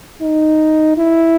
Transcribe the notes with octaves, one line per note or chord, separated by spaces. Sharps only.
D#4
E4